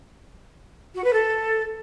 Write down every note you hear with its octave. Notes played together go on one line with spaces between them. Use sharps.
F#4
B4
A4